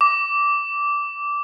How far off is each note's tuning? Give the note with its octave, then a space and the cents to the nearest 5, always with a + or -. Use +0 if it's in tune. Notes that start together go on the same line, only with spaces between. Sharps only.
D6 -15